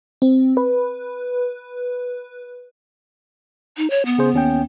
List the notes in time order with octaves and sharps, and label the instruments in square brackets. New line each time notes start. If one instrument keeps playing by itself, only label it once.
[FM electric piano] C4
B4
[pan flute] D#4
C#5
B3
[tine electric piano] C#3 G#4 C5
D#2 C#4 G5